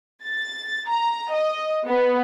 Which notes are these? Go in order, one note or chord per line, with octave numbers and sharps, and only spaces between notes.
A6
A#5
D#5
B3